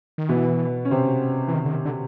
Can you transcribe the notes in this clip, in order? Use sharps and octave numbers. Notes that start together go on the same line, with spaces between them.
D#3
B2 E3 B3
C#4
C3 C4
E3
D#3
D3
D#3
D3